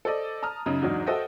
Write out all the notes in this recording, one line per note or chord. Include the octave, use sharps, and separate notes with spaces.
A4 C5 D5 D#5
A5 A#5 D#6 F6
F#2 C#3 D#4
E2 G#2 F#3 D4 D#4
F#4 A4 C5 D#5 E5 G5